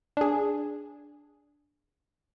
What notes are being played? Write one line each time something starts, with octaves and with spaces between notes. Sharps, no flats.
D4 G#4